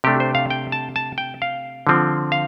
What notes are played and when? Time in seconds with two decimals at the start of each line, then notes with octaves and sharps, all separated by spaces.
0.04 C3 A3 D4 G4
0.20 C5
0.35 F5
0.50 G5
0.72 A5
0.96 A5
1.18 G5
1.42 F5
1.87 D3 F3 C4
2.32 F5